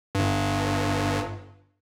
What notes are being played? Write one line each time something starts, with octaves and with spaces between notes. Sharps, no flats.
G1 G2